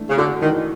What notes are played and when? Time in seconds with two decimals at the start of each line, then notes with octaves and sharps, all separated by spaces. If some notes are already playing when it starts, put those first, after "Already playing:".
Already playing: E3 A3 D4
0.10 C#3
0.17 D3 F#4
0.42 D#3 E3